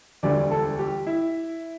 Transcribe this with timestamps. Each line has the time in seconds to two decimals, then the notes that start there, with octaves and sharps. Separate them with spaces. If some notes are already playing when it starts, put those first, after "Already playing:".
0.23 E1 D2 D3 G3 D5
0.51 A4
0.79 G4
1.07 E4